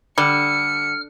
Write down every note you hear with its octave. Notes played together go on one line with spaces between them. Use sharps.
D3 G3 F6 C#7